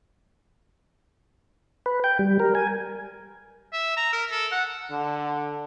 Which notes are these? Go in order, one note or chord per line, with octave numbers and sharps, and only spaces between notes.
B4
G5
G3
A#4
G#5
E5
A#5
A#4
A4
F#5
D3